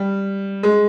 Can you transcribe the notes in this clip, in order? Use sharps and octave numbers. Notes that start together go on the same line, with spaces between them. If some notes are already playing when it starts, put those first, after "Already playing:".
Already playing: G3
G#3